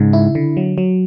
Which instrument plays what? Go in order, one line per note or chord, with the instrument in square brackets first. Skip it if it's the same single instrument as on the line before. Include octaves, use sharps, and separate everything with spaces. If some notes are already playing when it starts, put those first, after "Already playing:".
Already playing: [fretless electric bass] G#2 [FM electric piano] C#3
[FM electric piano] E4
D3
F#3
F#3